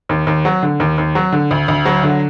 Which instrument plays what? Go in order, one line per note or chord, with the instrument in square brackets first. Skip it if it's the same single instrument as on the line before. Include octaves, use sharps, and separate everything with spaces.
[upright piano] D#2
D#2
F#3
D3
D#2
D#2
F#3
D3
D2
D2
F#3
D3